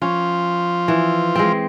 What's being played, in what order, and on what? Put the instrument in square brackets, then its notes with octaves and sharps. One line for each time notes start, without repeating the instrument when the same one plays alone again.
[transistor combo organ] F3 F4 [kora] C#4
[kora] E3
G#3 C4